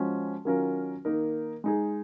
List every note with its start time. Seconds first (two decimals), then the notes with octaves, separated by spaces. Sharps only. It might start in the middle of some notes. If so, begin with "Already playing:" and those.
Already playing: F3 G#3 C#4 F#4
0.45 D#3 F#3 C#4 F4 A#4
1.05 D#3 A#3 D#4 A#4
1.64 G#3 D#4 G#4